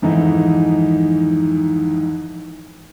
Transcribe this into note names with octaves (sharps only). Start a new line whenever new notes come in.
F2 G#2 D#3 E3 D#4